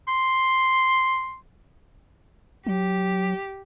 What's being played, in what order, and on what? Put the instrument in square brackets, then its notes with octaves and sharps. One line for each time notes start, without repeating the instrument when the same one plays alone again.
[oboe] C6
[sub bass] F#3 [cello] G4